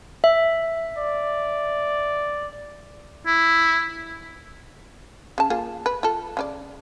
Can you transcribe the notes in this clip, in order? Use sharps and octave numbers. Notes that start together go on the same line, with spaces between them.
E5
D5
E4
C#3 A5
A#3 F4 G#4
B4
F4 A4
C#3 C#4 D5